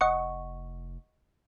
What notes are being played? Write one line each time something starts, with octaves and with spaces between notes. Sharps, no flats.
F1 D#5 F#5 C#6